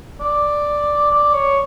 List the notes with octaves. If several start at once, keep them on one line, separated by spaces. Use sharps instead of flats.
D5
D5
C#5